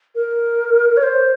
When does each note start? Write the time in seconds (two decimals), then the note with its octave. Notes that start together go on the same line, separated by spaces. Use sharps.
0.15 A#4
0.97 C#5
1.03 C5